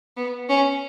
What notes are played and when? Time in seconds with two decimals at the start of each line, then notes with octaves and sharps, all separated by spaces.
0.17 B3
0.49 C#4